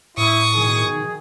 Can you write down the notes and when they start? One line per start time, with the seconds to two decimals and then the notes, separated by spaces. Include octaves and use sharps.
0.17 A2 E4 C#6 D#6
0.54 B2 D#3 G#4